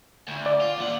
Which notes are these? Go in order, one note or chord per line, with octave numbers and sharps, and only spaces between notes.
D2
D5
F4
D#2 F#5